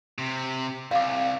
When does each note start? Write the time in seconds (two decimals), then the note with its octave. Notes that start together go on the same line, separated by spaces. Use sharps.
0.18 C3
0.91 C2 F5 D6